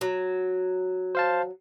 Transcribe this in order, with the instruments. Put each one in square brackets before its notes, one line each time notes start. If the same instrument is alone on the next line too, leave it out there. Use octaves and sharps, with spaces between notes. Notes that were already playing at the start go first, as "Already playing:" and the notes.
[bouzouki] F#3
[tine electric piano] C5 F5 A5